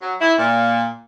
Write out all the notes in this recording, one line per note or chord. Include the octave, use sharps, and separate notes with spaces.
F#3
E4
A#2